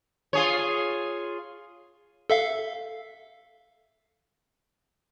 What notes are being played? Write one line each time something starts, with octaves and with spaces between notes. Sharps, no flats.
F4 G#4 C#5
A4 E5 F5